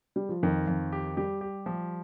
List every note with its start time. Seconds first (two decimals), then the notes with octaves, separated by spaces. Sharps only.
0.16 G3
0.29 F3
0.43 F2 D#3
0.67 F2
0.92 G4
1.17 G3 G4
1.41 G4
1.66 F3